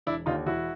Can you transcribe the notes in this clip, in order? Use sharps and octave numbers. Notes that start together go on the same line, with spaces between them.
E1 D4 E4
D#2 D3 D#4 F4
E1 E4 F#4